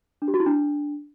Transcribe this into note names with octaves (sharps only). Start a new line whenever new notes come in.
D4
G4
F#4
E4
D4